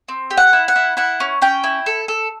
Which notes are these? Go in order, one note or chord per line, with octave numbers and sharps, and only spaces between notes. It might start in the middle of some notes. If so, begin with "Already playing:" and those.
C4
G4
F#5
E4
F#5
E4
E4 F#5
C#4
C#4 G5
E4
A4
A4